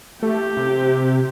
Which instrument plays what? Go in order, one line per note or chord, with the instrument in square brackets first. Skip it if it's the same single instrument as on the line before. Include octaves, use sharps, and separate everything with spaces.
[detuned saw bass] A3 [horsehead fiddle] G4
[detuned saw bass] C3